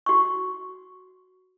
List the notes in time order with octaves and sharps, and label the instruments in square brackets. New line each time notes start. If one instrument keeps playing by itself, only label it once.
[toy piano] F#4 C#6